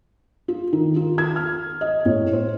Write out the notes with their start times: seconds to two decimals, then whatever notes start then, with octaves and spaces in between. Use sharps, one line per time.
0.48 F4
0.73 D#3
0.96 F4
1.18 G#6
1.36 F6
1.81 D#5
2.05 A2
2.33 C5